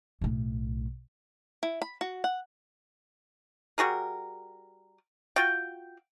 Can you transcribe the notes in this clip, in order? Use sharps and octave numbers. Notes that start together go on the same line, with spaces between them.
B1 A2
E4
B5
F#4
F#5
G3 F#4 G#4 A#4
F4 F#4 G5